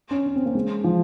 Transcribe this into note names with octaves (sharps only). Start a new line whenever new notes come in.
C#4
C#4
C4
A#3
G#3
F3